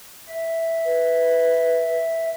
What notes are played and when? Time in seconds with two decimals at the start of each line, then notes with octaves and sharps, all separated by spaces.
0.29 E5
0.85 B4